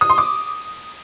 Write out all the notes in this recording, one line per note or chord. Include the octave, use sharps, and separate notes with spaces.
D#6
C6
D6